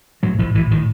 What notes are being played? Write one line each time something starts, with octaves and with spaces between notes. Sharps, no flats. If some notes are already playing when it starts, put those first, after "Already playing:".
A2 F#3
A2 F3
A2 E3
A2 D#3